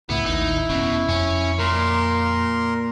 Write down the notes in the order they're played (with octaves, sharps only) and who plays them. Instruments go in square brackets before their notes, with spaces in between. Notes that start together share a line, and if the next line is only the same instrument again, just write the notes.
[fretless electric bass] C#2 A2 [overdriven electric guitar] B3 [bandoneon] E4
[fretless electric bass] A1 D#2 [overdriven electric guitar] D#4
[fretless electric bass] F1 C#4 [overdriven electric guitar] B2
[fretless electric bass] F2 [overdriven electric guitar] C#4
[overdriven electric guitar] A#2 [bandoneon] A#4 C6